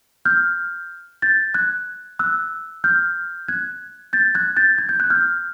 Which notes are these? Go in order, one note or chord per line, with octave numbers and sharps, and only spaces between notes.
F6 G6
G6 A6
F#6 G#6
E6 F#6
F6 G6
F#6 G#6
G6 A6
F#6 G#6
G6 A6
G#6
G6
F#6
F6 G6